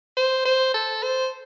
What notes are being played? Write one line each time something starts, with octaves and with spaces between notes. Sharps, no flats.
C5
C5
A4
C5